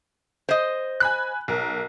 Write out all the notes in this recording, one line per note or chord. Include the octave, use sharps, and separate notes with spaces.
C5 D#5
G#5 B5 F#6
B1 A#4